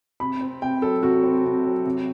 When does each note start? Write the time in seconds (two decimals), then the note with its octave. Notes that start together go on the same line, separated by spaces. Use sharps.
0.20 C3 B5
0.40 C4
0.62 C3 G5
0.82 F#3 A4
1.02 C3 F#4
1.23 C4
1.44 C3
1.65 F#3
1.85 C3